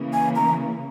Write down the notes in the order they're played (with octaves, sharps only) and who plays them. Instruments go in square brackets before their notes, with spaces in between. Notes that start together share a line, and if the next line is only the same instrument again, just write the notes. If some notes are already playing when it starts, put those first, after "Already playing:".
Already playing: [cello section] C#3 E3 A#3
[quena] G#5
A#5